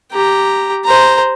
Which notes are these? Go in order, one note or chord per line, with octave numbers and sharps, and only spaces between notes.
G4 A#5
C5 A#5